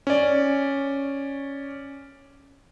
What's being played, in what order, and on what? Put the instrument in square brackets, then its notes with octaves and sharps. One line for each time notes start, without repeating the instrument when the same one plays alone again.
[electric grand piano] C#4 D5